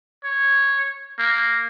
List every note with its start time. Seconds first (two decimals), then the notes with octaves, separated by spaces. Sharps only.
0.24 C#5
1.19 A#3